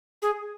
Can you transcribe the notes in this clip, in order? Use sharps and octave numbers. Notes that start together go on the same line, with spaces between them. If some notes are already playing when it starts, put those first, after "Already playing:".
G#4